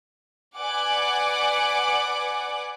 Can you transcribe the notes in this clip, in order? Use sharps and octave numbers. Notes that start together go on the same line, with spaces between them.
B4 D5 F#5 G#5 D6